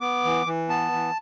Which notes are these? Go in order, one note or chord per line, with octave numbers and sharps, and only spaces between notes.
B3 D6
E3
E3
B3 A5
E3